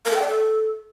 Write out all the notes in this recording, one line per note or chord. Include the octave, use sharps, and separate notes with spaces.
A#4
A4
G5
D5
A4